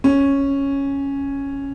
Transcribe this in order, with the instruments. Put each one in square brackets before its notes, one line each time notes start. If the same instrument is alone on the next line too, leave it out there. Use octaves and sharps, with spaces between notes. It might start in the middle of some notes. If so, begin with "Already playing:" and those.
[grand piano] C#4